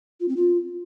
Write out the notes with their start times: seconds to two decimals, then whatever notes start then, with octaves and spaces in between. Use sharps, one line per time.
0.20 F4
0.28 C4
0.37 F4